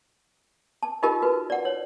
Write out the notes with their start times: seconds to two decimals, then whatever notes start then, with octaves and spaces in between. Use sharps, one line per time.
0.83 A5
1.03 D#4 F4 G4 A#4 D#5 A5
1.22 F#4 B4
1.50 D5 F#5
1.65 C#5